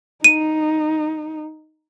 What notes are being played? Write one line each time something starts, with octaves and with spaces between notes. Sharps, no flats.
D#4 D#7